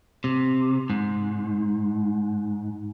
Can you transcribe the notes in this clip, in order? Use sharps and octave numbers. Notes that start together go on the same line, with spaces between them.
C3
G#2